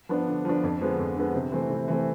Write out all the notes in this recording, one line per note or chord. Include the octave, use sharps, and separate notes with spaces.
F3 B3 D4
D3
F3 B3 D4
F2
D3 F3 G#3 B3
F2
D3 F3 G#3 B3
C3
E3 A3 C4
C3
E3 A3 C4